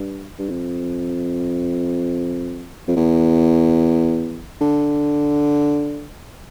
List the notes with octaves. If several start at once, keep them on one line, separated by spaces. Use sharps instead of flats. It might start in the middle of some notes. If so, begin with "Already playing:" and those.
Already playing: G2
G2
F2
F2
E2
D3